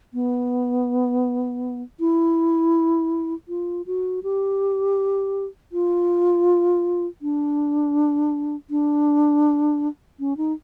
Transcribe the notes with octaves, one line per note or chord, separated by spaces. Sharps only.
B3
E4
F4
F#4
G4
F4
D4
D4
C#4
D#4